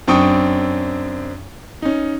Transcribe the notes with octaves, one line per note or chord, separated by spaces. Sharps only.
F#2 C4 D4 G5 C#6 D#6
C#4 D#4